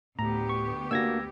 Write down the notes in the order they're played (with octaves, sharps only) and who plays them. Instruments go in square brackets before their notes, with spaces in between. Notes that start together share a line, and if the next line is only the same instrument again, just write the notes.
[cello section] D2 B3 G4 [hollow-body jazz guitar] A2 [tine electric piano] A#5
[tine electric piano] C#6
[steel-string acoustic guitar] A#3 F#4 [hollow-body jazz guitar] D4 [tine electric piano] E6 G#6 A#6